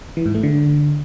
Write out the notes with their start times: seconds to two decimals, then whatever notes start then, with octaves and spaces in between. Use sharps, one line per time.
0.17 E3
0.26 G#2
0.35 A3
0.43 D3